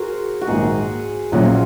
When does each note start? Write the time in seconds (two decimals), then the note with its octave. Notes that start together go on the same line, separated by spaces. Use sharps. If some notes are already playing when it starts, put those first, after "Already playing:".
Already playing: F#4 G#4 A#4 C5
0.41 F#4
0.47 A#1 G#2 D#3 A#3 D#4 G#4
1.32 A#1 A#2 F#3 C#4 F#4
1.45 F4